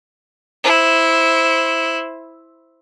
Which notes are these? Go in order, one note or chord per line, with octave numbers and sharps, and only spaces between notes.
E4 C5